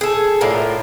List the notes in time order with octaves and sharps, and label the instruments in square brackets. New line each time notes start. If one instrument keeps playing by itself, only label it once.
[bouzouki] G#4 A4
A2 D3 F4 A#4